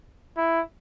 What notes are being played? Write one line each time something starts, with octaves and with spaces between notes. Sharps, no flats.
E4